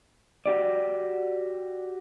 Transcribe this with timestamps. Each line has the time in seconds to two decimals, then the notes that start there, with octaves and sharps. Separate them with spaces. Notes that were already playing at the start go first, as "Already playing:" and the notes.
0.46 F#4 G4 D5